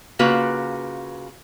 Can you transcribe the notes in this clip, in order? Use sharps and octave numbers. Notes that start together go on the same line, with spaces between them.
C#3 A#3 F4 F#4 B4